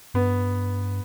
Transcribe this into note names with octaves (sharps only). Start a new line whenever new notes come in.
G2 B3